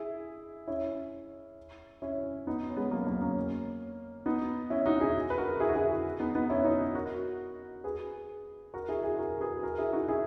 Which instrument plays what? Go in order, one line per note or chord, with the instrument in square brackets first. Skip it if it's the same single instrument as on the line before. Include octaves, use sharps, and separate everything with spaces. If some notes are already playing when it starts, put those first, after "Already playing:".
Already playing: [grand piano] E4 G#4
C#4 E4
C#4 E4
B3 D#4
C#4
G#3 B3
F#3 A#3
F#3 A#3
A#3 C#4
B3 D#4
C#4 E4
D#4 F#4
E4 G#4
B4
F#4 A#4
E4 G#4
F#4
E4 G#4
B3 D#4
B3 D#4
C#4 E4
D#4 F#4
F#4 A#4
G#4 B4
F#4 A#4
E4 G#4
E4 G#4
F#4 A#4
G#4 B4
F#4 A#4
E4 G#4
D#4 F#4
E4 G#4